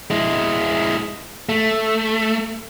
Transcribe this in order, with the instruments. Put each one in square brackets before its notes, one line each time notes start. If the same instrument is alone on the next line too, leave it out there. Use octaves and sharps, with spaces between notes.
[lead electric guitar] G#3 E4
A3